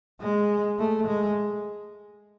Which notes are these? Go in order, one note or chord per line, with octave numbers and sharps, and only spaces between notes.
G#3
A3
G#3